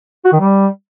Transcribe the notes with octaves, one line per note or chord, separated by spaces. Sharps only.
F#4
D#3
G3